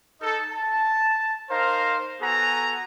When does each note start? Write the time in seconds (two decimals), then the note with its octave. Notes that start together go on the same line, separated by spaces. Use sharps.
0.21 D#4 A4
0.52 A5
1.50 D#4 A#4 C5 F5 A#5
2.21 B3 F#4 A4 G#5 A#5